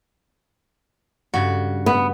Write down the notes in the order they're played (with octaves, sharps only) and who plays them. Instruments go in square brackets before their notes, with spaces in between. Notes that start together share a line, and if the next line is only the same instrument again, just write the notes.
[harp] G2 [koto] C#3 F#4
[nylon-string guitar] B3